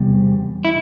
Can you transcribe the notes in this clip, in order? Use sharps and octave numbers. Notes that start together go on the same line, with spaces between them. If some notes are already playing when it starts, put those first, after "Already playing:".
Already playing: E2 C3 G3
E4